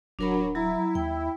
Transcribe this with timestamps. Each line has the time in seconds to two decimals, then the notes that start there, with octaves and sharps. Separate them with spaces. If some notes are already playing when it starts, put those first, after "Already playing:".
0.19 D1 F#3 D4 A#4 B5
0.55 F#3 E4 A#5
0.95 D#2 G5